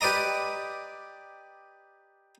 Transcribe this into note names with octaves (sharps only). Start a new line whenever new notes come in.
G4 B4 D5 D#5 A#5